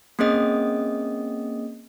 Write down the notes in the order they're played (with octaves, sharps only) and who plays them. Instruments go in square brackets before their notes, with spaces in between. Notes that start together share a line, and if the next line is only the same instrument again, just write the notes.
[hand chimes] A#3 C4 C#4 G#4 D#5 D#6